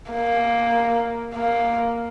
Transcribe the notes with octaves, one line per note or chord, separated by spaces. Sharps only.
A#3
A#3